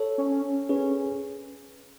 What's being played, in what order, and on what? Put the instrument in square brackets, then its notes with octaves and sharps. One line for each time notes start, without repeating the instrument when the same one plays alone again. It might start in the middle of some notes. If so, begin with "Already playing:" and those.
Already playing: [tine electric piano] A4 C#5
[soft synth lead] C#4
[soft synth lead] C#4 [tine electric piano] G#4 B4